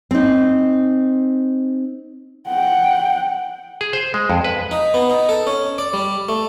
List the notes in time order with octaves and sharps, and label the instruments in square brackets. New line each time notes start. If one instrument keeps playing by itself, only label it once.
[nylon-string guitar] C4 D#4
[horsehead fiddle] F#5 G5
[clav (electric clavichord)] G#4
C5
G#3
F2
B4
[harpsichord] D#4
B3
D#4
A4
C#4
D5
G3
A3